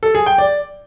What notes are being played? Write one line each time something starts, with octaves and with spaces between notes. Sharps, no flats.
A4
G#4
G5
D5